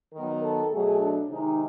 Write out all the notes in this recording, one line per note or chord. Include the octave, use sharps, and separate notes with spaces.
D#3 F#3 B3 A#4
A4
B2 F#3 A3 G#4
D4
C3 D#3 G#3 D#4